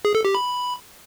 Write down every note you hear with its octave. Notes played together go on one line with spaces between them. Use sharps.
G#4
A4
G4
B5